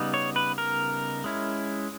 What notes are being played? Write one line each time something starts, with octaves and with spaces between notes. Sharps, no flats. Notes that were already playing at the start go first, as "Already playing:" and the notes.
Already playing: C#3 G3 B3 D#4
C#5
B4
A#4
G#3 C#4 E4